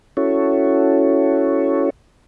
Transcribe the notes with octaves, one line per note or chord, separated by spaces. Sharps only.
C#4 E4 F#4 A4 C#5